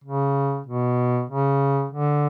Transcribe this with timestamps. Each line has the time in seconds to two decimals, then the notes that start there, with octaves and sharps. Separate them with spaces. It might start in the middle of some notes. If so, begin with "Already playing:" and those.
0.04 C#3
0.67 B2
1.30 C#3
1.92 D3